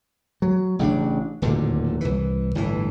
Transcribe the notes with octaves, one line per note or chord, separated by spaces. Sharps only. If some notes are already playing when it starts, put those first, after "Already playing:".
F#3
A1 C#3 B3 D4
D1 D#2 A#2 D3
C2 E3
G1 A2 E3